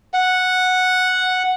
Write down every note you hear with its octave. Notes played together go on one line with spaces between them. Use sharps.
F#5